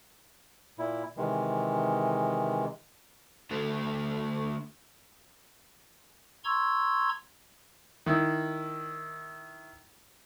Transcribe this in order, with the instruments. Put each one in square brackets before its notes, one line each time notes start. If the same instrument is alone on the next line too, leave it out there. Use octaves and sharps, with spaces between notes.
[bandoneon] A#2 E4
C3 D#3 E3 G#3
[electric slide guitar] D3 A3 D4 F#4 A4
[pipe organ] A#5 C6 C#6 E6 G#6
[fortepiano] D#3 E4